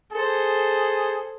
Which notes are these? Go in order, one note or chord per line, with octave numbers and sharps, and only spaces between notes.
G#4 A4 C5